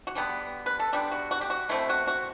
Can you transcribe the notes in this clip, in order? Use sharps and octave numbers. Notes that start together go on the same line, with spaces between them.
F#4
D3 G3 B3 D4 G4
B4
A4
D3 G3 B3 D4 G4
F#4
F#4
G4
F#4
B2 A3 C4 E4
F#4
F#4